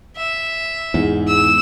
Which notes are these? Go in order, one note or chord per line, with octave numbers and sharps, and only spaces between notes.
E5
E2 G#2
E6